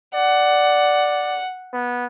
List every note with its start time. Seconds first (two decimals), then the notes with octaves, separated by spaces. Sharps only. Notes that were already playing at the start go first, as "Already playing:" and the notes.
0.14 D5 F#5
1.73 B3